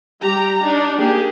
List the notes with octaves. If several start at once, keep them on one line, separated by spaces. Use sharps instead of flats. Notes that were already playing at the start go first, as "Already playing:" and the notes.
G3 G4 A#5
D4 D#4
A#3 G4 G#4